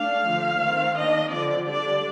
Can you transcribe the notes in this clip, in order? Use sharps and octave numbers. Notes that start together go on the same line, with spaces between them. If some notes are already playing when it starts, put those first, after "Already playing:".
Already playing: A3 D4 F5
D3 F3 A3
D#3 A3 C4
D#3 A#3 D4 D#5
D3 F3 C4 D5
D3 G3 D4 D5